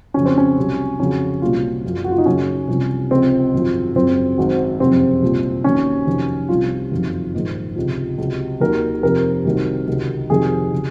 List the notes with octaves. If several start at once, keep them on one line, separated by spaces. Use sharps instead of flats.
F2 C#3 F#3 C#4
C4
C#4
C2 C3 F#3
F2 C#3 F#3 C#4
C2 A#2 F#3 F4
F#1 F#2 F3
F#4
F4
D#4
F#1 F#2 C#3 C#4
C2 C3 F3
C#2 C3 F3 C4
G#1 F#2 F3
F#1 F#2 F3 C4
G#1 G#2 F#3
F#1 F2 C3 C4
C2 A#2 F3
D#2 D#3 F#3 C#4
F2 C3 D#3 F#3
C2 C3 F3 F4
F#1 F2 D#3 F#3
A#1 G#2 D#3
C#2 C3 F3
C#2 C3 F#3
D#2 D#3 F#3 A#4
F2 C3 F3 A#4
C2 C3 D#3 F#3
C#2 C3 D#3 F#3
F2 C3 D#3 F#3 G#4
C#3 F#3